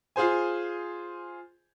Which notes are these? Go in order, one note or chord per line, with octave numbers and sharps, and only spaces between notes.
F4 G#4 C5 G#5